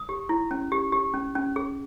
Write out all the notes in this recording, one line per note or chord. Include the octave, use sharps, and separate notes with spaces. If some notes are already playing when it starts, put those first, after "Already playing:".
Already playing: D#6
G4
E4
C#4
G4
G4
C#4
C#4
G#4